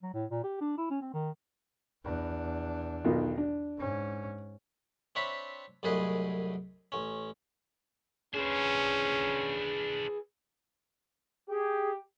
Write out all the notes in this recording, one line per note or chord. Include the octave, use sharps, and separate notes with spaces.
F#3
A2
A#2
G4
D4
E4
C#4
C4
D#3
E2 D4
B1 D#3 F4
D4
G#2 C#4
C4 D4 C#5 E5 B5
C2 F#2 A2 G#4 B4 D#5
A1 C#4
C#4 D4 G#4 B4 C5
G4 G#4